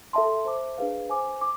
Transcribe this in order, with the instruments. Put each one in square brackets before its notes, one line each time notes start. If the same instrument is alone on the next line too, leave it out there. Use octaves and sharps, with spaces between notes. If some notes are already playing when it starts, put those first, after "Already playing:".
[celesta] A4 E5 A5 C6
C5 E5 A5 D6
D4 G#4 B4 F5
C5 G#5 D6
D6